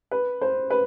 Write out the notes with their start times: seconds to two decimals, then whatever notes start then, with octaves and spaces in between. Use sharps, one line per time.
0.11 B4
0.41 C5
0.70 B4